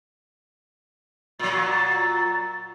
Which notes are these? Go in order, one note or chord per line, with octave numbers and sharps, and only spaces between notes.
A#2 F#3 A6